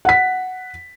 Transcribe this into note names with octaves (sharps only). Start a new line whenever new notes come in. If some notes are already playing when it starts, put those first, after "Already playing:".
F#5 B6